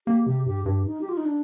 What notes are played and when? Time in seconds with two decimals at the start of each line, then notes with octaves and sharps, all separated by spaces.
0.07 A#3 G4
0.26 C3 G4
0.46 G2 G4
0.65 G2 G4
0.86 D#4
1.01 G4
1.09 F4
1.17 D#4
1.25 D4